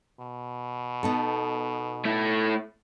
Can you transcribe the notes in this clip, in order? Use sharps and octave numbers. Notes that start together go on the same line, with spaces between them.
B2
B3 D#4 A4
A3 E4